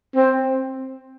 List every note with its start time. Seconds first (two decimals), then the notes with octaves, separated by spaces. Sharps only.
0.16 C4